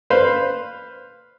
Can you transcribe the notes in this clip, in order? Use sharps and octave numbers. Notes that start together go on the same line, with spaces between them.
B4 C5 F5